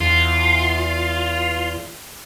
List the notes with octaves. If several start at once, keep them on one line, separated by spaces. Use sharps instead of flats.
E2 F4